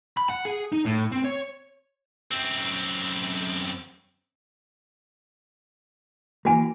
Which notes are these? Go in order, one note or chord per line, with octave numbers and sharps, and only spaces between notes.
B5
F#5
G#4
D#4
A2
C4
C#5
F#2 C4
E3 A#3 F#4 G#5